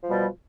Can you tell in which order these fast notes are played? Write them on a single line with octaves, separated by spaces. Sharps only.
F3 G3 B2